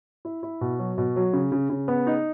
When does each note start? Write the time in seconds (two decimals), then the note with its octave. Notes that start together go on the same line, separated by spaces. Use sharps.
0.25 E4
0.43 E4
0.61 B2
0.79 F#3
0.98 B2
1.16 F#3
1.33 C#3
1.52 C#3
1.70 C#3
1.88 B3
2.07 D#4